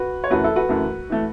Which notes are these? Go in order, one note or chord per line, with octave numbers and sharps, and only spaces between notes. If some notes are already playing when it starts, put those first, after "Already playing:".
Already playing: F#4 B4
C#5
F#2 E3 A3 F#4 B4
E4 A4
F#4 B4
F#2 E3 A3
E3 A3